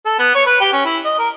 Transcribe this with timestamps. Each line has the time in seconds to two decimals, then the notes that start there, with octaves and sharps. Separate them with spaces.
0.06 A4
0.19 B3
0.35 C#5
0.47 B4
0.61 G4
0.73 C#4
0.86 E4
1.05 D#5
1.19 A#4